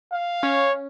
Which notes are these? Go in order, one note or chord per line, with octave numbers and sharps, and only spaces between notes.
F5
C#4 C#5